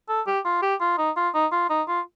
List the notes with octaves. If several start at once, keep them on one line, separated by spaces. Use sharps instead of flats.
A4
G4
F4
G4
F4
D#4
F4
D#4
F4
D#4
F4